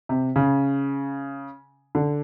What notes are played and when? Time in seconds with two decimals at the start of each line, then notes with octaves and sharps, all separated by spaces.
0.09 C3
0.36 C#3
1.95 D3